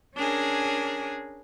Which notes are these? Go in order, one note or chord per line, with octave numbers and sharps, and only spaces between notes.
C#4 D4 G#4 A#4